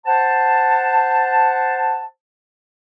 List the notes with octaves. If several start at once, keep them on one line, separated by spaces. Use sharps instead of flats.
C5 F#5 A5